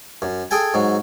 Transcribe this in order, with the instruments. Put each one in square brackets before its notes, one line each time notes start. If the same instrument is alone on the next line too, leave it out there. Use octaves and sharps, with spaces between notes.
[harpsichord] F#2
G#4 A4 G5 G#5
G#2 F#3